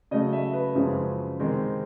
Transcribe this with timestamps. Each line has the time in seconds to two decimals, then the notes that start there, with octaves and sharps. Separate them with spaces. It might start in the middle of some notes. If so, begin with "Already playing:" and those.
0.11 C#3 F#3 A3 D#5
0.33 E5
0.53 B4
0.75 F#2 C#3 F3 G#3 C4
1.39 C3 D#3 G#3 C4